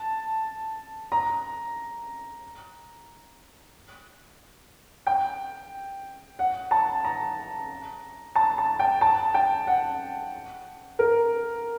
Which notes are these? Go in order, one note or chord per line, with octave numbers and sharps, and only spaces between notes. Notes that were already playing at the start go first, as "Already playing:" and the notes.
Already playing: A5
A#5
G5
F#5
A5
A#5
A5
A5
G5
A5
G5
F#5
A#4